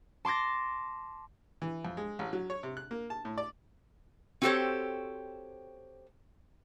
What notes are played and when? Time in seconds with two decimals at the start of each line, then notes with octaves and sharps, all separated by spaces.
0.25 A5 C6 D6 A6 A#6
1.62 E3
1.85 F2
1.97 G#3
2.19 A1
2.33 F#3
2.50 C#5
2.63 C3
2.77 F#6
2.91 A#3
3.10 A5
3.25 A2
3.38 D5
4.42 C4 F#4 G4 A4 C5 C#5